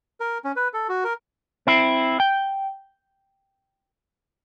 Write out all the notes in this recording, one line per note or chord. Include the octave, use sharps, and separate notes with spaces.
A#4
C#4
B4
A4
F#4
A#4
C4 E4
G5